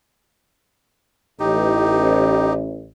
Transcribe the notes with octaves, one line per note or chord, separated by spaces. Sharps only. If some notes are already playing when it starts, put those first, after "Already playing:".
A1 D#4 G4